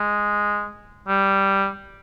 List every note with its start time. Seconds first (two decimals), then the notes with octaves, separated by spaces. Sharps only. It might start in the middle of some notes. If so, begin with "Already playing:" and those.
Already playing: G#3
1.08 G3